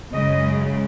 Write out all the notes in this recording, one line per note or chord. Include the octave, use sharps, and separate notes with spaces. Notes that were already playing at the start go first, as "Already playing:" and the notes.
F#2 C#3 G#3 D#5